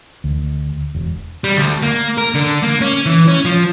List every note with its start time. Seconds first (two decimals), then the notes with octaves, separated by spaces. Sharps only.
0.24 D2
0.94 E1
1.44 G3
1.57 D2
1.83 A#3
2.18 A#4
2.34 D3
2.63 A#3
2.81 C#4
3.06 E3
3.28 C#4
3.45 F3